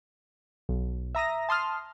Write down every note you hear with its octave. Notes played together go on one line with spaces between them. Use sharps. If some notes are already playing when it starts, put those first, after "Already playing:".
B1
E5 A#5 D#6 A#6
A5 C6 D#6 F6